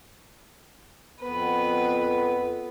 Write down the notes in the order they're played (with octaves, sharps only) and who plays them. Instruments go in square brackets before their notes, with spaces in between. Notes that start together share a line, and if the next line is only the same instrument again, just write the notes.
[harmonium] F2 B3 [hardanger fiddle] B4